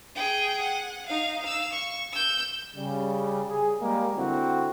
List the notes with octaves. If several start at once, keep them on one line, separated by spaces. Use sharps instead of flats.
G#4 G5
F#5
D#4 F5
F5 E6
C#6
E6 G6
C#3 G3
G#4
G3 G#3 A#3
D3 C4 E4 F#4